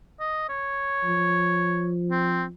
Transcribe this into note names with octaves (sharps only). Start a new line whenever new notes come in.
D#5
C#5
F3
C4